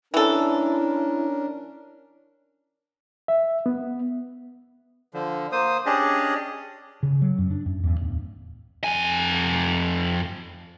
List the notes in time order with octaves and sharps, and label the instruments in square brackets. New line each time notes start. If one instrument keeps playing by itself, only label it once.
[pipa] E3 A4 [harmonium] C#4 D4 A#4 [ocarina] E4
[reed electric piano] E5
B3
[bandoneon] D3 F3
A#3 C5 D#6
C#4 D4 G4 G#4 D5 D#5
[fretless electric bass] C#3
F#3
F#2
D4
F#2
E2
D1
[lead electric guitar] F2 G#5